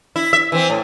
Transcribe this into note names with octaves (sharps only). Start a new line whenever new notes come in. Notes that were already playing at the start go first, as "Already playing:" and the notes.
E4
E5
E3 C4
A2